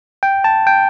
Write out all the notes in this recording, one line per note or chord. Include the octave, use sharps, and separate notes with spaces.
G5
A5
G5